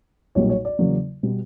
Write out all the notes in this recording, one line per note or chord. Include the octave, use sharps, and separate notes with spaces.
B1 A#2 G3 A#3 C#5
C#5
D5
E2 C#3 F#3 A#3
B2 G3 B3